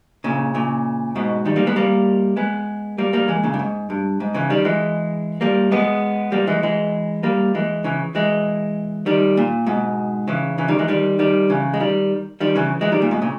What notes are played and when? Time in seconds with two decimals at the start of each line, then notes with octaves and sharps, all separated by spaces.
0.24 A#2 C#3
0.55 A#2 C#3
1.16 G#2 B2
1.45 D#3 G3
1.56 G3 A#3
1.67 G#3 B3
1.76 G3 A#3
2.37 G#3 B3
2.98 G3 A#3
3.13 G3 A#3
3.28 E3 G#3
3.43 A#2 C#3
3.54 G2
3.59 G#2
3.90 G2
4.20 G#2
4.34 C#3 E3
4.50 D#3 G3
4.65 E3 G#3
5.41 G3 A#3
5.72 G#3 B3
6.32 G3 A#3
6.47 E3 G#3
6.63 E3 G#3
7.23 G3 A#3
7.55 E3 G#3
7.84 C#3 E3
8.15 E3 G#3
9.06 D#3 G3
9.37 A#2
9.67 G#2 B2
10.28 C#3 E3
10.58 C#3 E3
10.68 D#3 G3
10.79 E3 G#3
10.88 D#3 G3
11.19 D#3 G3
11.50 C#3 E3
11.74 G#3
11.80 D#3 G3
12.41 D#3 G3
12.56 C#3 E3
12.81 E3 G#3
12.92 D#3 G3
13.02 A#2
13.11 G#2 B2
13.22 A#2 C#3